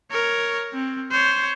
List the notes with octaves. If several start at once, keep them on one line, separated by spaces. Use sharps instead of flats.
A#4 C#5
C4
C5 C#5